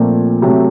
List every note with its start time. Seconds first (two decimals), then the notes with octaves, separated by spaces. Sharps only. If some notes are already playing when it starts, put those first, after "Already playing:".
Already playing: A#2 F3 A3 C4
0.42 C3 F#3 A3